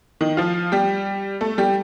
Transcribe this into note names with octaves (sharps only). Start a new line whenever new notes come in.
D#3 D#4
F3 F4
G3 G4
A3 A4
G3 G4